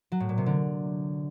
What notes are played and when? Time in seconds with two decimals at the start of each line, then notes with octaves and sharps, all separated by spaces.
0.12 F#3
0.20 A2
0.29 A#2
0.38 C3
0.46 D3